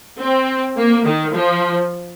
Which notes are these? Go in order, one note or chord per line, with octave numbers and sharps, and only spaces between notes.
C4
A#3
D#3
F3